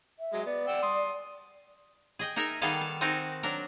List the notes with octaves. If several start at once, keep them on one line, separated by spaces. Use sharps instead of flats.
E5
F#3 G#3
B3 D5
F#5 G5 E6
C6 D#6
G#4 D#5 G5
D#4 G#4 A#4 E5
D#3 G3 B3 G#4 A4 F5
A5
C4 D#4 F#4 G#4 A#4 A5
F#3 D4 A#4